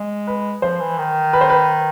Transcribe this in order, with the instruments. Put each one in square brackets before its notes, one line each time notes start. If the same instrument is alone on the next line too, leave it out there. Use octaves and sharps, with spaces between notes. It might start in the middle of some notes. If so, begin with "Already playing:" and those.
Already playing: [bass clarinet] G#3
[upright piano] B4
[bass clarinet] F3 [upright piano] C5
[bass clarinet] E3
D#3
[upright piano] B4
C5
B4